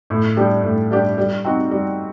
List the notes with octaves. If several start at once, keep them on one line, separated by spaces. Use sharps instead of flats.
A2
G3 D4 G4
A2
G3 D4 G4
G3
C4 D#4 F#4
G3